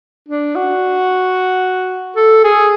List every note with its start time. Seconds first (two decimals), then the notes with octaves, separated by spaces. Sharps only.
0.28 D4
0.55 F#4
2.16 A4
2.44 G#4